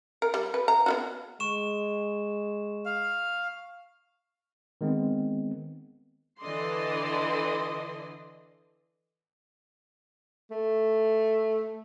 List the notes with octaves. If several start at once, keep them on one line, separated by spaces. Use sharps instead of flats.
A#4
G3
B4
A#5
B3 F4 F#4
G#3 C#6 E7
F5
D#3 G#3 B3 C4
D3 E3 A4 D5 D#5 C6
A3